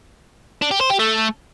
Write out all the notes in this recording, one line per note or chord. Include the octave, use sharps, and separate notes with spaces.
D4
G4
C5
G4
A3